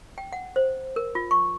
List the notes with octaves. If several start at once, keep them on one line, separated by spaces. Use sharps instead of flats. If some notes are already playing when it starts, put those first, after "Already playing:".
G5
F#5
C5
A#4
F4
C#6